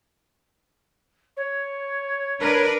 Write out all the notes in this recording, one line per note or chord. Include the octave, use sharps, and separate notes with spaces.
C#5
D4 A#4 B4